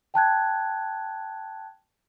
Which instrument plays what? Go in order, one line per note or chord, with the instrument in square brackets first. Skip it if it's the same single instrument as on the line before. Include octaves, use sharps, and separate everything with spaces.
[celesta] G5 A5 F#6 G#6